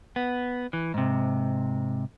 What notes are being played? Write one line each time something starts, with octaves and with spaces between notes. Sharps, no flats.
B3
E3
G#2 C3